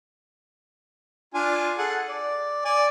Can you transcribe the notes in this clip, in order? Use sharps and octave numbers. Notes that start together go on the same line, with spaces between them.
D4 F4 G#5
G#4 A4 F#5
D5
D5 G#5